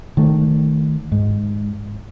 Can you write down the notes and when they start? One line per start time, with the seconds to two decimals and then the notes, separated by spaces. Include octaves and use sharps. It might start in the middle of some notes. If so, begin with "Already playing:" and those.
0.17 D#3 A3
1.12 G#2